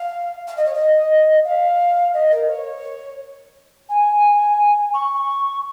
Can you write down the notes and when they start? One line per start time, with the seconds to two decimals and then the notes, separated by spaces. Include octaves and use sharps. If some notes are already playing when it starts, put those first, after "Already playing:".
Already playing: F5
0.47 F5
0.56 D#5
0.65 C#5
0.73 D#5
1.44 F5
2.13 D#5
2.31 A#4
2.48 C#5
3.89 G#5
4.93 C#6